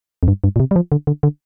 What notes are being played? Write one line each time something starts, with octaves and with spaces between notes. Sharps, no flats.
F2
G2
G2
A#2
C3
G3
F3
D3
D3
D3